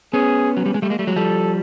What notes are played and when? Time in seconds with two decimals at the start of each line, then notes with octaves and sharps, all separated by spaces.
0.13 B3 C#4 G#4
0.57 F#3
0.66 G3
0.74 G#3
0.82 G3 A3
0.90 G#3 A#3
0.99 G3 A3
1.07 F#3 G#3
1.16 F3 G3 A4